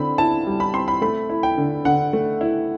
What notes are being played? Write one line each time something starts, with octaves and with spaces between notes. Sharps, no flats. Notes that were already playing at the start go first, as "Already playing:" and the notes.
Already playing: D3 C4 B5
E4 A5
G3
B5
C4 C6
B5
A3 B5
E4
G5
D3
D3 F#5
A3
E4